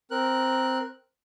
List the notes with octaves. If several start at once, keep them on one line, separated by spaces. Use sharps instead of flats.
C4 A#4 F#6